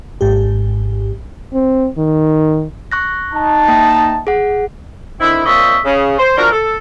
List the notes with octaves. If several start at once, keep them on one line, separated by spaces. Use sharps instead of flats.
G#1 G#2 G4
C4
D#3
C#6 F#6 A#6
D#4 A5
A#3 G5
G#4 F#5
D3 D#3 C4 E4
A#2 F3 C4 C#5 D#5 E5
C#3
C5
F3 D4 F#4 A#4
A4